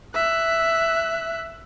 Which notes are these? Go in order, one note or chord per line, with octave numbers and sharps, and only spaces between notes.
E5 F#6